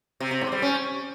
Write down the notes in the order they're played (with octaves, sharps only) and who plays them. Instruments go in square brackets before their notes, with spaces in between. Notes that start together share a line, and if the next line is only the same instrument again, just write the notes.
[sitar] C3
C3
G#2
G3
C#4